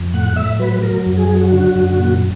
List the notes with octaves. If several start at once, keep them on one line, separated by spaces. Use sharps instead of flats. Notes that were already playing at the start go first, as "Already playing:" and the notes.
Already playing: F2
A2 F#5
A2 E5
F#3 B4
F#3 A#4
F#2
G#4
F#3 G#4
F#4
D3
F#2
A#2